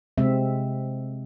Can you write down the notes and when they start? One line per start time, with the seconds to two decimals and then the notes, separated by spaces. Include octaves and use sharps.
0.18 C3 G#3 C4 E5